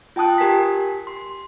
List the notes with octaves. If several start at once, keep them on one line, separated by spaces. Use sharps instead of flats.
F4 G5 A5 D#6 F#6
G4 A#4 G#5 B6
C6